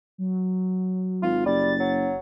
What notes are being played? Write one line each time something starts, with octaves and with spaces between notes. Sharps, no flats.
F#3
G#1 F4
F#1 G3 A6
F#3